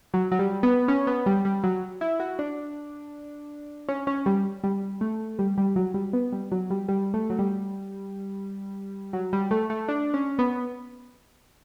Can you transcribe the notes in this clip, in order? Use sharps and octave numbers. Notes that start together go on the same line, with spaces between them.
F#3
F#3
G3
B3
C#4
B3
G3
G3
F#3
E4
F#4
D4
C#4
C#4
G3
G3
A3
G3
G3
F#3
G3
B3
G3
F#3
G3
G3
A3
F#3
G3
F#3
G3
A3
A3
D4
C#4
B3